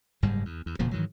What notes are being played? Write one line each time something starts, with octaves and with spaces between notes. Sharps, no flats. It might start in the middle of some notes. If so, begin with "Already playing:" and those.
F#1 G#2 G3 G#3
E2
E2
E1 A#2 C#3 F3
G#2 D#3 E3 F#3